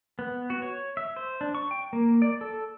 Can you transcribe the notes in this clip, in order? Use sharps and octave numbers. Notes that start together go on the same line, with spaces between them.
B3
F#4
C#5
E5
C5
D4
C#6
G5
A#3
D5
A4